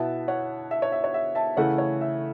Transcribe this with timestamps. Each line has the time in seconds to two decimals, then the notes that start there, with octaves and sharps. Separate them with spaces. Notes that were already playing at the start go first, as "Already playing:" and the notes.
Already playing: B2 B3 E4 E5 A5
0.28 C#5 F#5
0.71 E5
0.82 C#5
0.92 E5
1.04 C#5
1.14 E5
1.35 E5 A5
1.57 C#3 E3 A3 E4 C#5 F#5
1.78 C#5
2.01 E5